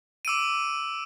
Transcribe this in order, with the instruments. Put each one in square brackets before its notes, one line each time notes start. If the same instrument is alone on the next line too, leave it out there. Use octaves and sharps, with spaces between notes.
[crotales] D6 E6 D7 D#7